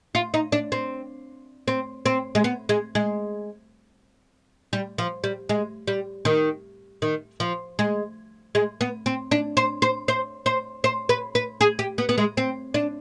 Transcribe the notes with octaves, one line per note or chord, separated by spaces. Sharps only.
F4
D#4
D4
C4
C4
C4
G#3
B3
G#3
G#3
G3
F3
G3
G#3
G3
D#3
D#3
F3
G#3
G#3
B3
C4
D4
C5
C5
C5
C5
C5
B4
B4
G#4
G4
B3
B3
G#3
C4
D4